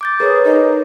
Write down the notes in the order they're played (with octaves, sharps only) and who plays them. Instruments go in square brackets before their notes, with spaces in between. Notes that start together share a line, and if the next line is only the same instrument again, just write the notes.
[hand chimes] D6 G6 A6
[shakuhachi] G#4 [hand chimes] A#4 B4 C#5
[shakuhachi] D#4